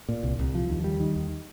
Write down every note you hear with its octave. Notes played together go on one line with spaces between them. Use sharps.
A#2
C2
C2
F3
D#2
G3
D#3
D#2